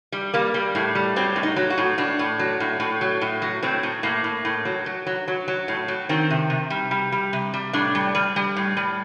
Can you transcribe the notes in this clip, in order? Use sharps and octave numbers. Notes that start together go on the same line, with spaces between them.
G3
G3 A#3
G3
A2
G3
F#3 C4
A2
D#4
F#3
F#4
A2
A2 D4
A2
F#3
A2
A2
F#3
A2
F#3
A2 C4
A2
A2 A#3
A2
A2
F#3
F#3
F#3
F#3
F#3
A2
F#3
D#3 C4
C3
C3
G3
G3
G3
C3
G3
A2 D4
G3
G3
G3
A2
G3